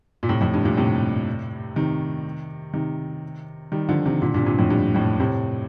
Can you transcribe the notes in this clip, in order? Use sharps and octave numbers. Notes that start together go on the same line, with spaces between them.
A#2
A2 C3
F2 A2
G2
G2 A#2
A2 C3
C3 D#3
C3 D#3
D#3 G3
D3 F3
C3 D#3
A#2 D3
G2 A#2
C3
G2 A#2
F2 A2
G2
F2 A2
A2 C3